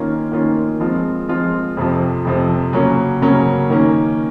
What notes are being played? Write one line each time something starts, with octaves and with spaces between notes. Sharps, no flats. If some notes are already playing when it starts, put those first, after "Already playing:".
Already playing: D#3 A#3 C#4 F4
D#3 A#3 C#4 F4
F3 G#3 C4 F4
F3 G#3 C4 F4
F2 C3 F3
F2 C3 F3
C#3 F#3 A#3 C#4
C#3 F#3 A#3 C#4
D#3 A#3 C#4